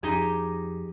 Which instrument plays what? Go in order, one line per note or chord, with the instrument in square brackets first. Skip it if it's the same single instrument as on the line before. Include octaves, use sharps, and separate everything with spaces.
[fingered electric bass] F2 [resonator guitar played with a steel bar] D#4 G4 G#4